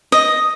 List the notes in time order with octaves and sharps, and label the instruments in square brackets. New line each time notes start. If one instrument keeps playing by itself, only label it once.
[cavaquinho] D#5